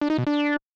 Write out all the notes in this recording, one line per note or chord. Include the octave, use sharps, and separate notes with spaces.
D4
D#4
B2
D4